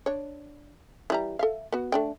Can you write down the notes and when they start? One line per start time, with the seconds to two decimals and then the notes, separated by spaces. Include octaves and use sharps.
0.06 D4 C#5
1.10 E3 G3 A#5
1.39 A4 E5 F5
1.72 B3 F#4
1.92 A3 D4 G5